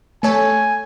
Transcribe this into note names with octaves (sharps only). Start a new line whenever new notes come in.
A3 A4 C#5 G#5